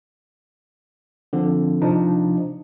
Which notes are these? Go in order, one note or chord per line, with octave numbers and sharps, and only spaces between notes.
D3 F3 C4
C3 F3 D4 D#4